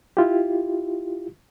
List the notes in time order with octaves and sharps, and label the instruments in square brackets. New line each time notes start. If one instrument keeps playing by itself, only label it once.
[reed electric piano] E4 F4 G4